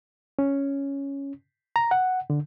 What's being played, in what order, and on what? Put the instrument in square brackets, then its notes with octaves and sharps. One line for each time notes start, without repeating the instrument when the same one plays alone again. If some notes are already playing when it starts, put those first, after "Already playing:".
[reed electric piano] C#4
A#5
F#5
D3